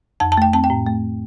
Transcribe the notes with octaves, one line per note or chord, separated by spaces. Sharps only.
F2 A5
A5
A3 G5
C4 A5
G5
A2
A3